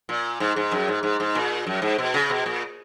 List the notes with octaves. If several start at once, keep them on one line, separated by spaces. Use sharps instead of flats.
A#2
G#2
G#2
F#2
G#2
G#2
G#2
A#2
F#2
G#2
B2
C#3
B2
A#2